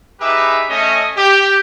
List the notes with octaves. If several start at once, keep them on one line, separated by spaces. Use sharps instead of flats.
D#4 G4 G#4 B4 E5 D6
A3 C#4 D#5
G4